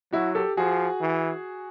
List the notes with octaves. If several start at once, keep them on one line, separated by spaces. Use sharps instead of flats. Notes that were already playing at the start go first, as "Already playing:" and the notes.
F#3 E4 F#4
G4 A4
F3 F#4 G#4
E3